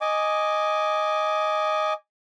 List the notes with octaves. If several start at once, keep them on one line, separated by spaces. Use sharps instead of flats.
D#5 G#5 D6